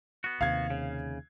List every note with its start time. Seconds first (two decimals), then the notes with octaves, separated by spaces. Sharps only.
0.24 B3 F#4
0.41 D#2 C3 F5 G#6
0.70 C#3